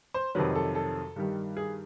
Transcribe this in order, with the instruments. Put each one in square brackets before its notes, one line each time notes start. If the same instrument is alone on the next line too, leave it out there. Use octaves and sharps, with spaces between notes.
[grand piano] C5
F2 C3 D#3 F#3 B4
A4
A4
G2 D#3 G3
G#4